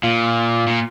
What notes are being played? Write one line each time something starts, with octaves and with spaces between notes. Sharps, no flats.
A#2 F4
A#2